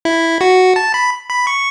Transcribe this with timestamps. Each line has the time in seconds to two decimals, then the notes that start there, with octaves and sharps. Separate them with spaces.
0.05 E4
0.41 F#4
0.76 A5
0.94 B5
1.30 B5
1.47 C#6